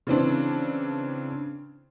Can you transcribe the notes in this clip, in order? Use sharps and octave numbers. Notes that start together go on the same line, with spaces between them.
C#3 E3 C4 D4